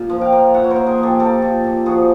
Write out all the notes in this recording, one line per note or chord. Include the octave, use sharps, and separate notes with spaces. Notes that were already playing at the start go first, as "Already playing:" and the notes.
Already playing: A#2
F3
F5 G5
A#3
A#2 E5 F#5
C#5
A#4 C5
A#2
G#4 A#4
F3
G4 A4
A#3 G4 A4
A#2
A#2
F3 F#4 G#4